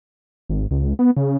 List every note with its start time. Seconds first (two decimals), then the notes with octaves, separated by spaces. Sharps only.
0.49 G#1
0.71 C#2
0.99 B3
1.17 C#3